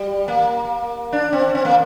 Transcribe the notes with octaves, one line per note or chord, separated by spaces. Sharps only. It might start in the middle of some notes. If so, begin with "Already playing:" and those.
Already playing: G3
A#3
D4
C4
C4
A#3